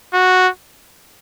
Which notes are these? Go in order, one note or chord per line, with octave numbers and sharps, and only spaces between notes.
F#4